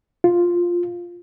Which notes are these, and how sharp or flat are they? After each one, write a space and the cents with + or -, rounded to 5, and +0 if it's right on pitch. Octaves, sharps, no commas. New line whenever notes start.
F4 +5